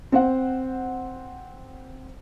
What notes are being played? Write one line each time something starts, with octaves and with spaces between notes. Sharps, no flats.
C4 C5 F#5